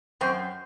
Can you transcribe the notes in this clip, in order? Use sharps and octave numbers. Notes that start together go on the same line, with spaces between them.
F#2 C4